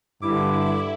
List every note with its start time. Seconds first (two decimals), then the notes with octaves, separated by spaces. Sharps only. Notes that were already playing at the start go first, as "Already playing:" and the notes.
0.22 G2 D3 E4 D6